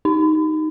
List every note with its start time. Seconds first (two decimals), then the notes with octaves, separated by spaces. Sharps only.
0.05 D#4